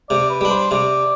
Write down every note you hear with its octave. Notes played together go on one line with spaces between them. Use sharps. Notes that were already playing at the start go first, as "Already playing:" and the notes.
C3 D5
B4
G3 D4
C5
C3 D5